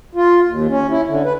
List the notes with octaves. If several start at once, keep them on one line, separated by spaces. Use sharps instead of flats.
F4
D#2
C#4
E4
D3
B4